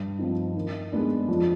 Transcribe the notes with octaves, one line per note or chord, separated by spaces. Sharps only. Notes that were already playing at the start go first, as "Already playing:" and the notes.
Already playing: G2
F3 C4 D#4
D#3
G#3 B3 D4
F2